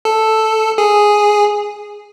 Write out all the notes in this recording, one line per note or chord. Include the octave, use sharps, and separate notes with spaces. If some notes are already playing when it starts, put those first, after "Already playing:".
A4
G#4